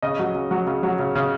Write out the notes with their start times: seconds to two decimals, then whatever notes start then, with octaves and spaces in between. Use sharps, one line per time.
0.02 C#3 D#5
0.19 F#3
0.35 C#3
0.51 F#3
0.67 C#3
0.83 F#3
0.99 C#3
1.15 C#3